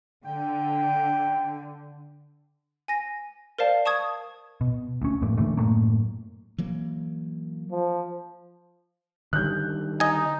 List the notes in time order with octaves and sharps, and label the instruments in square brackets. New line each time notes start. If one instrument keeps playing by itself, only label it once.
[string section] D3 [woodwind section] G5
[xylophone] G#5 A#6
A#4 C5 D5 F5 A5
A5 C#6 D#6 G#6
[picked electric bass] B2
D2 C#4
F2 A2 A#3
A#2 D3 E3 A3
F#2 A2 A3 A#3
[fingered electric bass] E3 F#3 A#3
[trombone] F3
[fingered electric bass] D3 D#3 G3 [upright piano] F#6 G6
[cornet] D#4 [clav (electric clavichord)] D#5 G#5